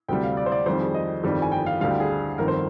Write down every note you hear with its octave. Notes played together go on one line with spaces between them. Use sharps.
D2 C3 G3 G5
F5
D5
C5
D5
F2 D#3 G3 C5
G#4
D#5
G1 F2 D#3 G3
G#5
G5
F5
D2 D3 G3 F5
G5
G#4
G1 F2 D#3 A#4
C5